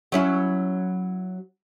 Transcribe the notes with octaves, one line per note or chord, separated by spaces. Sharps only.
F#3 C#4 E4